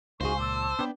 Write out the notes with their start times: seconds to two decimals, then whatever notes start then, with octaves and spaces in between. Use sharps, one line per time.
0.21 C#2 D#4 F#4 G#4 C5 F5 G#5 C#6
0.39 A#2 A5 D6 E6
0.79 B3 D4 B4 G5